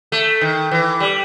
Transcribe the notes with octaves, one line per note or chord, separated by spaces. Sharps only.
A3
D#3
E3
G3